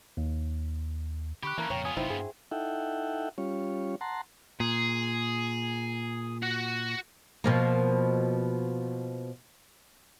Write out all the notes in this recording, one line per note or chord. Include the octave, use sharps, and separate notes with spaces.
D#2
D3 G4 B5 C#6 F#6
E3 A3 A#3 C#4 A#4
F2 A#2 C#3 C#5 G5 A#5
B3 F4 G#5 D#6
G1 C3 F#3 C4 D#4 E4 F#4
G2 D4 G#4
D#4 E4 A4 E5 F#5 G5
G3 C#4 F4 C#5
F#5 A5 A#5 C6
A#2 G#4
F#4 F#5
B2 F3 A#3